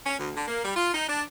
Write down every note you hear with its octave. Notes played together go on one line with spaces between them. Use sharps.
C#4
D2
D3
A#3
G3
F4
D#4
D4